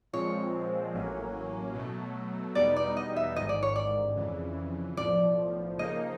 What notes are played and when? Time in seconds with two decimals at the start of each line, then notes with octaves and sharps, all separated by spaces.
0.13 A#2 F3 G#3 C4 C#5
0.94 A1 A2 F#3 A#3 C#4
1.75 B2 F#3 A3
2.55 E2 B2 G3 B3 D#4 D5
2.76 D5
2.97 D#5
3.16 E5
3.36 A1 G#2 D#3 D#5
3.49 D5
3.63 C#5
3.76 D5
4.17 F2 C#3 E3
4.97 B1 A2 F3 D5
5.78 C#3 F3 A#3 D#4 D#5